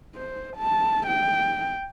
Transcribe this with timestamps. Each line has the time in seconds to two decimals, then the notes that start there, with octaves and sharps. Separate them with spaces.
0.15 C5
0.56 A5
1.06 G5